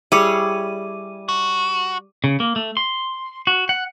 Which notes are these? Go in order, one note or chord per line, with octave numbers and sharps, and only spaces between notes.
G3 E4 G#4 C#5 D6 D#7
F#4
C#3
A#3
A3
C6
F#4
F#5